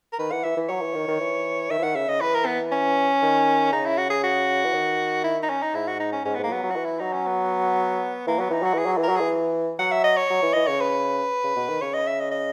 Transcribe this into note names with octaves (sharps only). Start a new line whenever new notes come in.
A#4
D#3 B4
E3 F#5
E3 E5
E3
F#3 C#5
E3
D#3
D#3
E3
D#3 E5
E3
D#3 F#5
C#3 E5
C#3 D#5
E3 B4
A#4
B3
C#4
D#3
C#3 D#4
E4
F#4
G#4
F#4
E3
D#3
E4
D#4
C#4
D#4
G#2 E4
F#4
D#4
C#4
G#2 C#4
B3
G#2 A#3
F#3 B3
F#3
F#4
E3
E4
F#3 D#4
C#4
B3
E3 A#3
F#3 B3
E3 D#4
F#3 F#4
E3 G#4
F#3
E3
A#4
F#3
E3 G#4
F#3 F#5
E5
D#5
C#5
F#3
E3
E3 D#5
C#3 C#5
B4
C#3
B2
D#3
C#3 C#5
D#5
E5
D#5
D#5